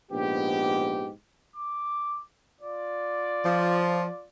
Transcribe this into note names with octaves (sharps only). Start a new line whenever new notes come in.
A#1 G#2 B3 G4
D6
F4 D5
F3